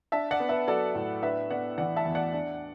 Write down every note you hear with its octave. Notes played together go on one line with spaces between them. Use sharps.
D4 E5 A5
D5 F#5
B3
B4 E5
F#3 A4 D5
A2
D4 B4 E5
B3 D5 F#5
E3 D5 F#5
E5 A5
E2
D5 F#5
D4